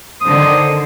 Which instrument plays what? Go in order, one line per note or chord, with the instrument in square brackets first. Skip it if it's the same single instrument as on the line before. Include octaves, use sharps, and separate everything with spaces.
[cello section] D3 D#3 C5 [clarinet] D#6